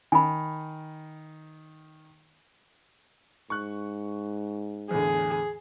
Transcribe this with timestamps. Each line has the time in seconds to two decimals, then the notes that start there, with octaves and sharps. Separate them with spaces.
0.12 D#3 G#5 B5
3.50 G#2 C#6 F#6
4.91 E2 A2 D3 G#4